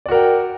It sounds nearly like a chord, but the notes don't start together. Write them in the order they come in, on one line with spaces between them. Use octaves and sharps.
D5 F#4 A#4 G5